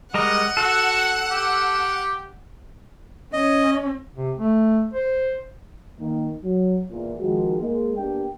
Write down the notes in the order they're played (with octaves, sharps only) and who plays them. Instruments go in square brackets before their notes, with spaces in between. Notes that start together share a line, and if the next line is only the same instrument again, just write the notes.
[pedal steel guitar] G3 G#3 A#4 [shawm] D#5 [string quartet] F#5
[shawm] F#4 [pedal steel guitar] A4
[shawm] G4
[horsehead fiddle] C#4 [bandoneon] D#5
[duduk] C3
A3
C5
[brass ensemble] D#3 A#3
F#3
E2 A#2
D#3 F3 G#3 F#4
G#3 A#3
A#3 B3 D4 G4 G5